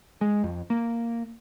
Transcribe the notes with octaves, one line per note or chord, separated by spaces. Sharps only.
G#3
F2
A#3